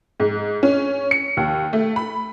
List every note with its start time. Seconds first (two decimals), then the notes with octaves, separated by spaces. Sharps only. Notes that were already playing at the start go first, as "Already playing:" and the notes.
0.20 G#2
0.63 C#4
1.11 C#7
1.37 D#2
1.73 A3
1.96 B5